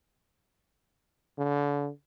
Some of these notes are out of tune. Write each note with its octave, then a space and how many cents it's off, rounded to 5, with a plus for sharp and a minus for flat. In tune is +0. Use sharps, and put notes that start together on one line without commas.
D3 -35